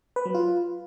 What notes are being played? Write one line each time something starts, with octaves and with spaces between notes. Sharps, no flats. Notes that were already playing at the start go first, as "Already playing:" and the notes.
B4
F#3
F4